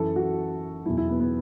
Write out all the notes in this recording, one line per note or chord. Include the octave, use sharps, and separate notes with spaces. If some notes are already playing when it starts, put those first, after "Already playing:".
Already playing: F#2 E3 A4
F#4
E2 B2 F#3 E4
E4
B3
B3